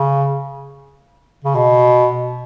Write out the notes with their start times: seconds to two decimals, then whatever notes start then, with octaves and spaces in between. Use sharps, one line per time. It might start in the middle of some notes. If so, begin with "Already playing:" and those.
Already playing: C#3
1.44 C#3
1.55 B2